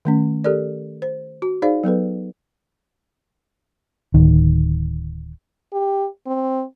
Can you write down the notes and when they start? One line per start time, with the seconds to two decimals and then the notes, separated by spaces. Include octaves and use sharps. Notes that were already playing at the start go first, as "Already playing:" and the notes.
0.05 D#3 A3 C#4
0.44 G4 A4 A#4 D5
1.02 C5
1.42 F#4
1.62 D#4 G#4 C5 D5 F5
1.84 F#3 B3 A4 B4
4.14 D1 D#3
5.73 G4
6.26 C4